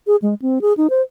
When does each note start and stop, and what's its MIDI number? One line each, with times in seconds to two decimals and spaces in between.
0.07 0.16 68
0.22 0.34 56
0.42 0.59 60
0.62 0.73 68
0.77 0.87 63
0.90 1.02 72